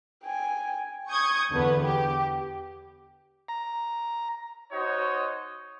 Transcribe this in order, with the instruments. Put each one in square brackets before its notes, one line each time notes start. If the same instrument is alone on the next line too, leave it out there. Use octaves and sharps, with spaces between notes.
[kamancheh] G5 G#5
[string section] C#6 D#6 G6 G#6
E2 D3 B3
G4
[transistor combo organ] A#5
[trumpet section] D#4 F#4 C5 C#5 D#5